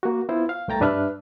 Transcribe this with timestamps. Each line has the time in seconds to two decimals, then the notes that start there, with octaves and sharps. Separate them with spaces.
0.03 A#3 F#4
0.29 B3 E4 F4 C5
0.49 F5
0.68 C2 A3 G5 A#5 A6
0.80 G2 D4 B4 E5 F6 F#6